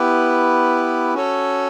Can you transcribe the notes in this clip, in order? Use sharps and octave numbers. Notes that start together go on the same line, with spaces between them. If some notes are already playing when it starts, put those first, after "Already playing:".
Already playing: B3 E4 G4 B4
C#4 F#4 A4 C#5